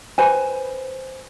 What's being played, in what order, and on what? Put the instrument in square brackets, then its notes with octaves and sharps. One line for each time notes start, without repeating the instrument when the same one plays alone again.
[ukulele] B4 C5 G#5